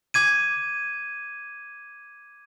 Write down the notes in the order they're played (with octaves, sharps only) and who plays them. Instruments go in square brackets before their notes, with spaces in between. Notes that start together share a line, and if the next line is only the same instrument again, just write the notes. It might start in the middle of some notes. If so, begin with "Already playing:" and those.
[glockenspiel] D6 G#6 D#7